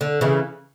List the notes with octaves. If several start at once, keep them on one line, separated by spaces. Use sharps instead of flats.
D3
C#3 E3